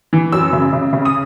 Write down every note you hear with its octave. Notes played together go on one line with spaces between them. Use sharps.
E3
F#2 E6
C#3
C#3
C#3
D#6